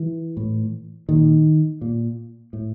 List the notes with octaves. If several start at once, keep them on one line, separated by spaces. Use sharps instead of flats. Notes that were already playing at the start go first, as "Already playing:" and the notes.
Already playing: E3
A2
A#2 D#3
A#2
A2